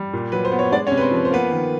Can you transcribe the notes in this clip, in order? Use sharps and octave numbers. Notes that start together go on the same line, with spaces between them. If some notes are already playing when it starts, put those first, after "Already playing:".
Already playing: G3
A#2
F#3 B4
C5
B3
C#5
G#3 D4 D5
C#4 C#5
C3
B4
C4 C5
F3
B4
C5
A#3 B3 B4
D#3